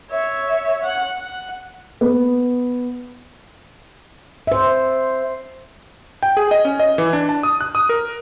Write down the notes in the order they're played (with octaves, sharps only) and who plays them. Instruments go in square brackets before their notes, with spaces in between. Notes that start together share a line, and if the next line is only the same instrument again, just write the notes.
[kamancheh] C#5 E5
F#5
F#5
[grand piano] B3
[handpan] C5 E5
[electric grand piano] G5
G#4
D#5
C#4
D#5
E3
D4
A5
D#6
F#6
D#6
A#4